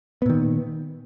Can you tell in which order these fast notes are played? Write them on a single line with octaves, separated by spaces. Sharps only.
B3 A#2 D#3